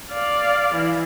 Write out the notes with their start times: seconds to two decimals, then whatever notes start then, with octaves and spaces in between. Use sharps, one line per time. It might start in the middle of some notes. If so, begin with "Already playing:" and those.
0.13 D5 F5
0.75 E3